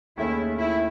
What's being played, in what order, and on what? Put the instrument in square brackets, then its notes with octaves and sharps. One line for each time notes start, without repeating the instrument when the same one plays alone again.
[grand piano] D#2 D#3 A3 C#4 G#4 [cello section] E4
[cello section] E4